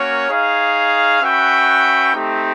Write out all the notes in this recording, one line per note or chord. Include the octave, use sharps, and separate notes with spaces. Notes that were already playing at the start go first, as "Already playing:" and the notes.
Already playing: A#3 C#4 F#4 A#4 C#5
D#4 G#4 C#5 F5
C#4 F#4 B4 E5 G5
A3 C4 D#4 G4